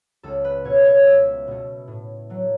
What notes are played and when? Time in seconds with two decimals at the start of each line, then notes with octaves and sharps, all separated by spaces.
0.23 C#2 A4
0.44 B4
0.64 B2 A3 C#5
0.85 C#5
1.06 C#2 E5
1.48 B2 A3
1.88 A2
2.29 F#3 A3